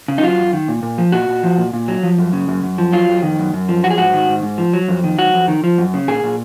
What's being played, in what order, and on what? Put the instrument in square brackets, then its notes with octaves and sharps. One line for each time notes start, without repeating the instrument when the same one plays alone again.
[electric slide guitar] C#3
D#4
F#3 F4
F#2
D#3
A#2
A#2
F3
A#2 F#4
A#2
F3
A#2
A#2
F#3
F3
F#2
C#3
F#2
F#2
F3
F#3 F4
F2
D#3
F#2
F#2
F3
F#3 F#4
G#4
G#2 F#4
D#3
G#2
G#2
F3
F#3
F2
D#3
F#3 F#4
F2
D#3
F3
F#2
C#3
A#2 G#4
A#2